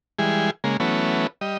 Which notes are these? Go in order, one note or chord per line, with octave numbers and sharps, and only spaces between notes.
E3 G3 G#3 G#4
C#3 G#3 A#3
E3 F#3 A3 B3 C#4
G3 D#5